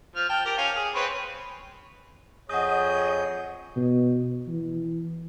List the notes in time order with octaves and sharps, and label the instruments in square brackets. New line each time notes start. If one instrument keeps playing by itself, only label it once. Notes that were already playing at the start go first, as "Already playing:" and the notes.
[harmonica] F3 F6
G5 A5
G4 A#4
C#4 F5
G#4
C4 B4 C#5
[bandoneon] F2 G#4 G6 [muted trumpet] C#5 [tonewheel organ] D#5 [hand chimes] F#5 D#6
[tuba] B2
E3